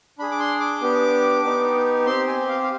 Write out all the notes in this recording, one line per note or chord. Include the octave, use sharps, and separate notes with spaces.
D4 G#4 B5
D6
C6
D6
B3 D4 G4
B3 D#4 G4
C4 G4 C6
G#5
F5
F5